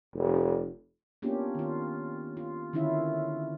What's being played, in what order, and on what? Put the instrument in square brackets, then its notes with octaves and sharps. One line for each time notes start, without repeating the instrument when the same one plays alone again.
[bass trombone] F1
[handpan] A#3 B3 C#4 D4 F4 G4
D#3 F4
F4
D3 D#3 C#4 E4 F4 E5